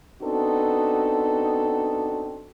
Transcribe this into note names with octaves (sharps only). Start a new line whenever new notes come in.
B3 C4 D4 D#4 F#4 A4